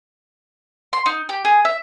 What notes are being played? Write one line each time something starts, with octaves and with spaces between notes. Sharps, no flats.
C6
D#4
G4
G#4
E5